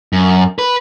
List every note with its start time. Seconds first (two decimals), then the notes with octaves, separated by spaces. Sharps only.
0.13 F#2
0.59 B4